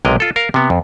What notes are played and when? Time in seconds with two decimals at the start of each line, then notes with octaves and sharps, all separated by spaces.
0.05 B1 C3 G#3 A#4 D#5
0.20 F4 A4
0.36 A#4 F5
0.54 C3 B3
0.70 F2